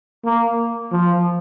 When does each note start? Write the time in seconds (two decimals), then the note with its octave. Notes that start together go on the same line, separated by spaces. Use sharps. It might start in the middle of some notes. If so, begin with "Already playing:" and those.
0.25 A#3
0.92 F3